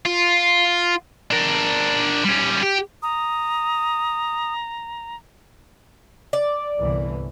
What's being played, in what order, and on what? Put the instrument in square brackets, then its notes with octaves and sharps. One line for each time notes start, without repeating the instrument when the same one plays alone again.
[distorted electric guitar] F4
D4 A#4
G3 C#4
G4
[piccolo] A#5 [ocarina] D#6
[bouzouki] D5
[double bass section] G1 C2 E3